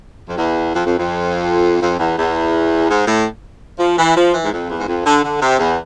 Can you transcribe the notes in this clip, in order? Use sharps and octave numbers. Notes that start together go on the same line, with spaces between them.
F2
E2
F2
F2
F2
F2
E2
E2
G#2
A2
F3
E3
F3
E3
G#2
F2
E2
G#2
F2
D3
D3
C3
E2